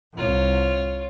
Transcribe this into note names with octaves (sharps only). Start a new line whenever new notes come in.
C2 F4 C#5